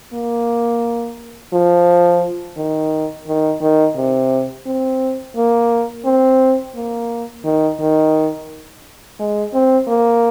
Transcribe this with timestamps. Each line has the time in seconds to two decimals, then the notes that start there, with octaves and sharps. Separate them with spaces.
0.13 A#3
1.53 F3
2.57 D#3
3.27 D#3
3.61 D#3
3.96 C3
4.66 C4
5.36 A#3
6.05 C4
6.75 A#3
7.44 D#3
7.80 D#3
9.19 G#3
9.54 C4
9.88 A#3